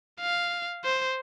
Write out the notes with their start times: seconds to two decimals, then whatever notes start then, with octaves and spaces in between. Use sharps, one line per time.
0.21 F5
0.85 C5